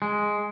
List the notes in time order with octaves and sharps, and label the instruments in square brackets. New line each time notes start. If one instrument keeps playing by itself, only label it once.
[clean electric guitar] G#3